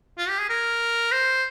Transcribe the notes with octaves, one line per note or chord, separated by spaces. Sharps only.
F4
G4
G#4
A#4
C5